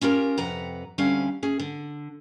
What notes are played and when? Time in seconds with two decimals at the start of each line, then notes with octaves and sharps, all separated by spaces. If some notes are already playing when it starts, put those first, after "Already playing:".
0.01 C#4 F4 G4 A#4
0.38 F2 C3 B4 F#5 A#5
0.98 D2 D3 G3 C4 C#4 F5
1.43 A3 C#4 G#4
1.59 D3